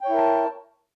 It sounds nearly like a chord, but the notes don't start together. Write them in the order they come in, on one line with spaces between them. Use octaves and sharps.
G5 C#5 E4 A#4 A5